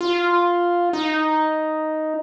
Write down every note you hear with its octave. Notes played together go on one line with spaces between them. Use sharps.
F4
D#4